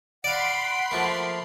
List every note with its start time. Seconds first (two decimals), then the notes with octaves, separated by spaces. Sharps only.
0.24 D5 F5 F#5 B5 C6 C7 D7
0.91 F3 A3 A#3